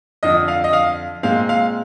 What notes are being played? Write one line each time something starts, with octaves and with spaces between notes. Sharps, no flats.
F2 D3 F3 D#5
F5
D#5
F5
A#2 G#3 C4 F5
F5